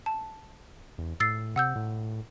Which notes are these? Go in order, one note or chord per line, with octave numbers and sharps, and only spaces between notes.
A5
E2
A2 E6 A6 C7
C3 F#5 E6 G6
A2